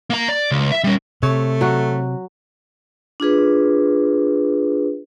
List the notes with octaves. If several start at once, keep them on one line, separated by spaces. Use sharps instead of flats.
A#3 A#5
D5
C#2
E5
G3 C#4
C3 A3 C#5
F#3 F#4
D4 F4 G#4 B4